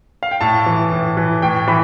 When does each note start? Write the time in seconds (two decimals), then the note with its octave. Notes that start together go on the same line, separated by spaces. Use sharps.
0.23 F5
0.31 G5
0.41 A2 A5
0.66 E3
0.92 A2
1.17 E3
1.42 A2 G5
1.68 E3 B5